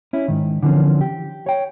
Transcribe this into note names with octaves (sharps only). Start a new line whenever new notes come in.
C#4 E4
G#2 D#3
D3 E3 F3 C4 C#4
G4
C#5 G5